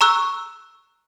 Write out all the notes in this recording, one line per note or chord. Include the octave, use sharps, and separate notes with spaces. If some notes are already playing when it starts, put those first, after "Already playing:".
A#5 C#6 E6 F#6